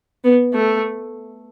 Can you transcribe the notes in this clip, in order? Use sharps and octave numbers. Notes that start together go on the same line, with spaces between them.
B3
A3